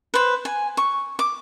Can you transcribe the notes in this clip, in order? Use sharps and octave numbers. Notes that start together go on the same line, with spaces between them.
B4 C5
G#5
C#6
D6